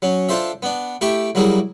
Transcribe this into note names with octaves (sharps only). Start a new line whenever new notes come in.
F#3 C#4
D4 F4 A4 C5 E5
B3 D4
A3 E4 G4 E5 G5
F#3 G3 A#3 E4 G#4